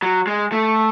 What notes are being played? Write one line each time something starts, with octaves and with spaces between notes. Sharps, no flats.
F#3
G#3
A3